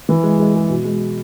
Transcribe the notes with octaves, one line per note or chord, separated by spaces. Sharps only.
E3
G#3
G#3
G#3
B2
G#3